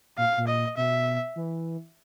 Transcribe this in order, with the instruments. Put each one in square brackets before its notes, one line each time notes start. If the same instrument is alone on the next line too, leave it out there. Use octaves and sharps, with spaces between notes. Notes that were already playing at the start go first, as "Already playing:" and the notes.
[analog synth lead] A#2 [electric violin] F5
[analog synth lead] A#2
[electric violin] D#5
[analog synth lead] B2 [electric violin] E5
[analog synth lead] E3